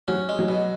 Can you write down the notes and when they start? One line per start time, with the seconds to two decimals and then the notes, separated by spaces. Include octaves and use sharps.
0.08 F#3 C#4 F#4
0.29 G#3
0.39 F#3 F#4
0.48 B2